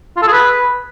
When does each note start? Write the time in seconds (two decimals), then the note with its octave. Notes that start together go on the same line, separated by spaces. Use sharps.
0.17 F4
0.22 A4
0.28 G#4
0.33 B4